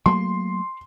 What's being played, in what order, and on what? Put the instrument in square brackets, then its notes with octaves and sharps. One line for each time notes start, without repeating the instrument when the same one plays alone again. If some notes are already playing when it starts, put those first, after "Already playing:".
[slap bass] F#3 A3 A#3 [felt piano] C6